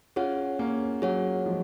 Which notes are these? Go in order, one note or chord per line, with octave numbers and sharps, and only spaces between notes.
C#4 F4 G#4 C#5 F#5
A#3 C#4
F#3 G#4 C#5 F#5
F3 G#3